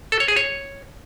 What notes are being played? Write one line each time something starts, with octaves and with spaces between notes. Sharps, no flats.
A4
C#5
G#4
C#5